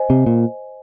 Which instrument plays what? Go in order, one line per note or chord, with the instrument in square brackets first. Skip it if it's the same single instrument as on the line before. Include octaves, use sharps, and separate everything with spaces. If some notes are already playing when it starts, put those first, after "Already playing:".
Already playing: [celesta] C5 D#5 G#5
[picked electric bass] C3
A#2